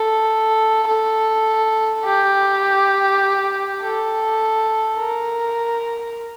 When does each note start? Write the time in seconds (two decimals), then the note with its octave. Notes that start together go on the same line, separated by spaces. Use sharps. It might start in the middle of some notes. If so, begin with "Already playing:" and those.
Already playing: A4
0.88 A4
2.05 G4
3.82 A4
4.98 A#4